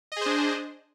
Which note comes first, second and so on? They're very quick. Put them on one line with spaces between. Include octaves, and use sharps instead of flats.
D#5 G#4 C5 D4